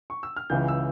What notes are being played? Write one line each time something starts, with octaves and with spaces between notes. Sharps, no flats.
C#6
E6
F6
C#2 C#3 E3 G6
E6